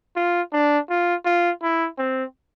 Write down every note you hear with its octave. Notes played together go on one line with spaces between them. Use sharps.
F4
D4
F4
F4
E4
C4